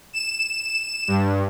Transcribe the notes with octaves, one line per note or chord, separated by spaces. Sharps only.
E7
G2